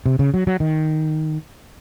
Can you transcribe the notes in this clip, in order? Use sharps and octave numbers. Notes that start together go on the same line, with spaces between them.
C3
C#3
F#3
F#3
D#3